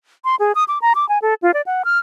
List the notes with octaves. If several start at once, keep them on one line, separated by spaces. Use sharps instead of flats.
C6
G#4
D#6
D6
A#5
D6
G#5
A4
F4
D5
F#5
F6